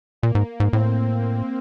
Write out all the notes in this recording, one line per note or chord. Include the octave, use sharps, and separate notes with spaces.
A#2 A#3
G#2
G#2
A2 C4